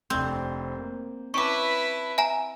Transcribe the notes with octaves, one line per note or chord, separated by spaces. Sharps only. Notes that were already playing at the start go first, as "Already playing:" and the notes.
F1 C4 D4 G6
A#3
C#4 E4 B4 A5 C#6 D6
E5 G#5 A#5